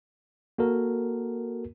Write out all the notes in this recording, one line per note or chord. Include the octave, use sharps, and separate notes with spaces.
A#3 F#4 A4 A#4